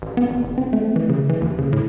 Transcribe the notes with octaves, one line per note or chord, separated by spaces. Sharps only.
A1
B3
A1
F#1
C4
A3
E3
C#3
E3
D#2
C#3
A2